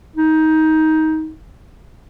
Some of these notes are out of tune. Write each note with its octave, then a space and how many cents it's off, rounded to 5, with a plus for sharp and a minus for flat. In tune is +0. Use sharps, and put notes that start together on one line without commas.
D#4 +15